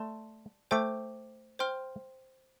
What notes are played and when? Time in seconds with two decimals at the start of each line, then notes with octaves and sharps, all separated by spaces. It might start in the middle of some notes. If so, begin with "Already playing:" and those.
Already playing: A3 D5 A5 C6
0.71 A3 C5 G5 D6
1.59 C5 G5 C6 F6